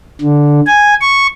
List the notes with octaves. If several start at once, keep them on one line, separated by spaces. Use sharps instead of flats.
D3
G#5
C#6